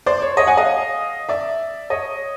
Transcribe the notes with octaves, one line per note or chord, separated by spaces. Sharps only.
C5 D5
C#5
C#5 D#5
F#5 G#5
D#5 F5
D5 E5
C#5 D#5